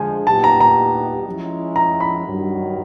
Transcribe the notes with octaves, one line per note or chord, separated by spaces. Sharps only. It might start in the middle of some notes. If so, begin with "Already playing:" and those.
Already playing: D3 F3 G#3 G#5
A#2 F#3 B3 D#4 G4 A5
A#5
A#5
F3 G#3 C#4 E4
A#5
B5
G2 D#3 F#3